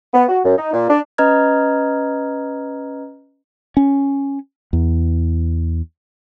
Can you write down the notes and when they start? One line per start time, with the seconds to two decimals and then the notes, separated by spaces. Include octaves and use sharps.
0.13 B3
0.28 F#4
0.44 F#2
0.57 D#4
0.73 A#2
0.89 D4
1.18 C#4 B4 D#5 A#5 F6 G#6
3.77 C#4
4.73 E2